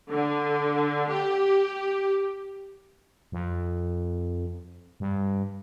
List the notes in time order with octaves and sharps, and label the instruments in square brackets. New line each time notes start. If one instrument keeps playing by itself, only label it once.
[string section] D3
G4
[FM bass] F2
G2